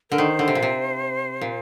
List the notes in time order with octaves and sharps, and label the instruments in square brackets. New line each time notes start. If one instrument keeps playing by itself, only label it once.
[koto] D3 [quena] A#4
[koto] D#3 [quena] C5
[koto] D3
C3
A#2
C3
A#2